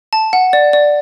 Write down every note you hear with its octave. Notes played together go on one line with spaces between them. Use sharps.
A5
F#5
D5
D5